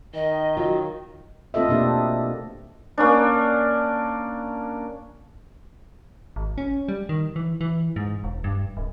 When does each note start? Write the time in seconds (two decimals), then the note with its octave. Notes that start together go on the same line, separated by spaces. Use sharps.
0.14 D#3 D#5
0.57 F#3 F4
1.54 A3 C4 F4 A4 D#5 E5
1.69 B2 A#3 D4 G4
2.98 A#3 C#4 D4
6.36 G#1
6.58 C#4
6.88 G3
7.09 D#3
7.36 E3
7.61 E3
7.96 G#2
8.24 E1
8.44 G2
8.77 D1